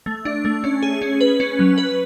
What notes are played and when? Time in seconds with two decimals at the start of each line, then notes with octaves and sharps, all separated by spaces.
0.06 A3
0.25 D4
0.45 A3
0.64 C#4
0.83 G#4
1.02 C#4
1.21 B4
1.40 C#4
1.59 F#3
1.78 B4